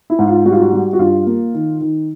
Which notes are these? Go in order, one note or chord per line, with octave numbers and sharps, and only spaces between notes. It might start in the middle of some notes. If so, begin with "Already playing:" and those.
E4
G#2
F4
G3 F#4
F4
F#4
G3
F#4
G2 F4
A#3
D#3
D#3